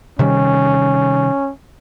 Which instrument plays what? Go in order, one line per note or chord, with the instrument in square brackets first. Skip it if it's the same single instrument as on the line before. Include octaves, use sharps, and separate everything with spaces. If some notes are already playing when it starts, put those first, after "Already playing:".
[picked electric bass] C3 D#3 G3 [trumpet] C#4